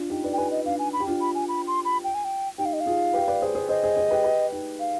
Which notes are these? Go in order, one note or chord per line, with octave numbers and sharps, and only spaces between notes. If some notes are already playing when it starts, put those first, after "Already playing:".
Already playing: D4 F4
D#4 G4
B4 D5
G5
G4 B4 G#5
D#5
D4 F5
G#5
B5
G4
D4 F4
B5
G#5
B5
C6
B5
G5
G#5
G5
D#4 G4 G5
F5
D#5
F5
F4 G#4
G4 B4
B4 D5
G#4 C5
G#4 C5
G#4 C5 D#5
G#4 C5
G#4 C5
G4 B4
G4 B4
D#4 G4
F5